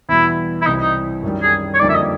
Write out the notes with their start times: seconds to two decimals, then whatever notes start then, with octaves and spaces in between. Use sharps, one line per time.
0.09 E2 B2 G3 E4
0.62 E4
0.66 C2 C3 E3 G3 C4 D#4
0.81 D#4
1.23 F#2 D#3 G3
1.42 G#4
1.74 C#5
1.80 F2 D3 G3 A#3 D#4 D5
1.89 E5
1.95 D#5